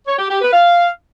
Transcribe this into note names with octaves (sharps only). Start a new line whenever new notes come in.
C#5
G4
G4
B4
F5